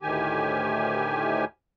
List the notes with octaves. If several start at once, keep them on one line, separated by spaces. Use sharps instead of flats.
D2 A2 D#3 G4 G#5